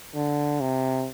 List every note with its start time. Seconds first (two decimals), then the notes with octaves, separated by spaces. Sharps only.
0.15 D3
0.60 C3